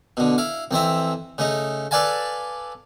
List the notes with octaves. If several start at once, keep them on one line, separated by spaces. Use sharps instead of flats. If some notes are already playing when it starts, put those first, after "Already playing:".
B2 D3
E4 F5
F2 E3 C4 E5
C#3 A3 D#4
A4 B4 D5 F5 G#5 A5